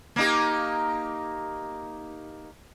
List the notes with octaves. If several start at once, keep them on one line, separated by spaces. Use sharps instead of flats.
A#3 D#4 G4